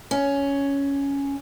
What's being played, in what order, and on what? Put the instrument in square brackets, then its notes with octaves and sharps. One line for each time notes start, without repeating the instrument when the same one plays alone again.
[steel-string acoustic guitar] C#4